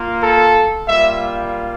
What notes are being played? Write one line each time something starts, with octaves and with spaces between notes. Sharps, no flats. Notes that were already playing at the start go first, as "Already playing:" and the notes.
Already playing: A#3 F4
A4
G3 A#3 F4 E5